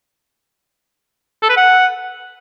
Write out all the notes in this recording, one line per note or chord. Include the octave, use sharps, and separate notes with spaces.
A4
B4
F#5